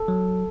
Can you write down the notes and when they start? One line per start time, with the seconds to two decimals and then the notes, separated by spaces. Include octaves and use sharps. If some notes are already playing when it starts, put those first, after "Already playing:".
Already playing: A4
0.08 F#3